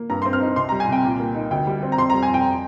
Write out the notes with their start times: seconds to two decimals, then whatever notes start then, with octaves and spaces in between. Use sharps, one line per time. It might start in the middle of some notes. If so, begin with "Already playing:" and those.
Already playing: A#3
0.10 G2 A#5
0.22 C4 C6
0.33 F6
0.41 D#4
0.56 C2 C6
0.69 G3 A#5
0.80 G#5
0.88 C2 G5
1.05 A#2
1.20 A#3
1.35 D#4
1.51 D2 G5
1.67 G3
1.83 C4
1.92 A#5
1.98 F2 C6
2.10 G3 A#5
2.23 G#5
2.30 F2 G5